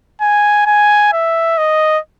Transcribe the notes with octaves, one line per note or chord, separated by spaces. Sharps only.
G#5
G#5
E5
D#5